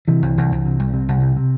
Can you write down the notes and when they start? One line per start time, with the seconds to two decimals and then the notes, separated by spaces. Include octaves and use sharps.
0.08 C3 E3
0.22 C2
0.37 C2
0.52 C2
0.66 C3
0.79 C2
0.94 C3
1.08 C2
1.22 C3
1.36 C3